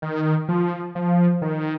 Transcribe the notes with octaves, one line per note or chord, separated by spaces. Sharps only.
D#3
F3
F3
D#3